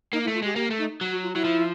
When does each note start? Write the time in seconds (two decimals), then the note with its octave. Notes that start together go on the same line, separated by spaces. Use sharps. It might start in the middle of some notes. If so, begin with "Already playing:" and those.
0.13 A#3 D#4
0.24 E4
0.28 A3
0.34 F4
0.42 G#3 G4
0.56 A#3 G4
0.71 A3
0.79 D#4
1.01 F#3
1.12 F#4
1.23 F4
1.34 F#3 E4
1.45 F3